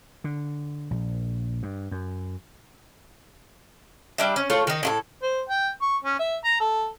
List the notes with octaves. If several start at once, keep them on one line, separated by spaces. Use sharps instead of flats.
D3
A#1
G2
F#2
G3 D4 E5
C#4
A3 F4 A4 C#5
D#3 D#4
A2 F4 A4
C5
G5
C#6
C#4
E5
A#5
A4